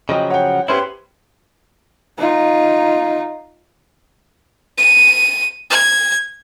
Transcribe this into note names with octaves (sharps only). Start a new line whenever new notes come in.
C#3 F3 F#3 D#5 G5
C#5 F#5 G5
B3 C#4 E4 G4 B4 C5 C6
D#4 F4
D#7
G#6